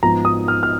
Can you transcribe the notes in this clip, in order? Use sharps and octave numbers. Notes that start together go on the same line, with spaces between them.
G#2 F3 B3 D#4 A#5
D#6
F6
F6